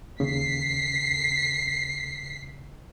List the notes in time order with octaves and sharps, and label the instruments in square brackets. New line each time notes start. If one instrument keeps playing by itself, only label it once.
[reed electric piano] D#2 C#3 [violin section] B6 C7